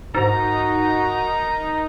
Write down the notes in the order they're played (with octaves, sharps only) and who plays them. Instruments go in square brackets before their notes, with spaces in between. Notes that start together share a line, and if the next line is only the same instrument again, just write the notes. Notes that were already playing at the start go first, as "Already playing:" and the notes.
[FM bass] G#2 [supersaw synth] D#4 [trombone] F#4 [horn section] A#4 A#5